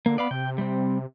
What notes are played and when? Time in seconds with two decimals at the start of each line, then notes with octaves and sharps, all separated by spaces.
0.06 D3 A#3
0.18 B3 D5 F5 B5
0.31 C3 G5
0.58 G3 C4